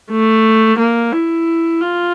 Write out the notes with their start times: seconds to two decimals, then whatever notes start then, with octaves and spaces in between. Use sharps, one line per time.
0.11 A3
0.79 A#3
1.13 E4
1.81 F4